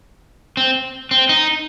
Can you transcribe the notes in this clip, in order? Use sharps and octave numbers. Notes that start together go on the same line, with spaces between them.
C4
C4
D#4